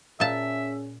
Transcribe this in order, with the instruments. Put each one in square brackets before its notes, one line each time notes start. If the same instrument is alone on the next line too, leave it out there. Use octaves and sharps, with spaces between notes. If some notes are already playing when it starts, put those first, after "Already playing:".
[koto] A#2 A5 [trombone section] C#4 G#4 [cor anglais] E5